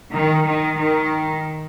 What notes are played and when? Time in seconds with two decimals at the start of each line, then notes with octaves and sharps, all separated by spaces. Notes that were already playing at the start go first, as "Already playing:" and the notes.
0.11 D#3
0.44 D#3
0.76 D#3